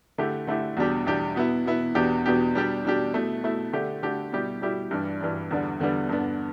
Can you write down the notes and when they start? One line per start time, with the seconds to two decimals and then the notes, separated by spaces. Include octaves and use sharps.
0.18 D3 A3 E4 G4
0.47 D3 A3 E4 G4
0.77 E2 B2 G3 D4 G4
1.07 E2 B2 G3 D4 G4
1.36 B2 B3 E4
1.66 B2 B3 E4
1.95 E2 B2 B3 D4 G4
2.25 E2 B2 B3 D4 G4
2.55 B2 G3 D4 G4
2.85 B2 G3 D4 G4
3.14 B2 A3 E4
3.43 B2 A3 E4
3.73 D3 A3 D4 G4
4.03 D3 A3 D4 G4
4.32 B2 G3 E4 G4
4.61 B2 G3 E4 G4
4.91 G2 E3 G3 D4
5.20 G2 E3 G3 D4
5.51 E2 D3 G3 B3 D4
5.80 E2 D3 G3 B3 D4
6.09 G2 D3 B3 D4